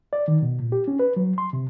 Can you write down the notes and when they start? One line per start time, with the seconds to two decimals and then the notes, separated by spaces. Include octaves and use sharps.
0.13 D5
0.28 D#3
0.42 B2
0.60 A#2
0.72 G4
0.88 C#4
0.99 B4
1.16 F#3
1.38 C6
1.53 C3